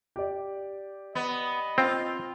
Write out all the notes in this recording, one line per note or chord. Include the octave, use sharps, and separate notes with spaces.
G4 D5
B3 D#5
C4 F4